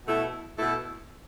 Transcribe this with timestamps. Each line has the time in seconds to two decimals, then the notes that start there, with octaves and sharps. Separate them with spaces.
0.05 B2 A3 E4 A4
0.56 B2 A3 E4 A4